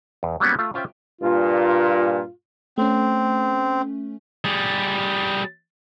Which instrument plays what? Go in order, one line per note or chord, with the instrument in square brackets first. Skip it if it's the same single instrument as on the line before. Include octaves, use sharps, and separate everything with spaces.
[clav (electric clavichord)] E2
F#3 G3 A#3 B3 C#4
A3 F4
C#4 F4 C5 E5 G5
[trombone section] G2 A#2 [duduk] F4
[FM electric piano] A3 C#4 [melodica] C4
[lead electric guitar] G3 G#4